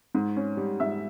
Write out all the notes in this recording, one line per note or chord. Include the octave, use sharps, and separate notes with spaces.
G#2
C#4
G3
G#2 E5 E6